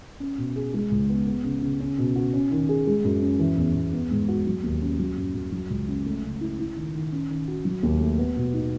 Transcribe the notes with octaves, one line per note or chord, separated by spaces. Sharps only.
C#4
B2
G#4
G#3
C#2
B3
B3
C#3
C#3
C#4
B2
F#4
C#4
D#3
G#4
G#3
F#2
C#4
E3
E2
E2
B3
G#2
F#4
F#3
D#2
C#4
F#3
F#2
F#2
F#3
C#2
C#4
A3
C#3
E4
E4
D#3
D#3
C#4
D#3
F#4
F#3
D#2
A3
B3
B2
D#4